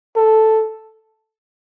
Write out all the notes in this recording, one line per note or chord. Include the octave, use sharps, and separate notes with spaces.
A4